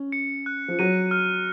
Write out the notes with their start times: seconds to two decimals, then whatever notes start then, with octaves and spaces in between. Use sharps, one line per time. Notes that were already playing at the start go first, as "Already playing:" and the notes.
Already playing: C#4
0.12 C#7
0.46 F#6
0.68 F3
0.79 F#3 D#7
1.11 F6